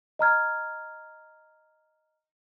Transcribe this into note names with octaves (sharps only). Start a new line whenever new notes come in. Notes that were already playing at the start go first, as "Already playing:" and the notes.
D#5 A#5 F6 G#6